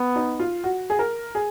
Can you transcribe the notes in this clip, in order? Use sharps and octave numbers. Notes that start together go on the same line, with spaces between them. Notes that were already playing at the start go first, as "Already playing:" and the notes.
Already playing: B3
D#4
F4
F#4
G#4
A#4
G#4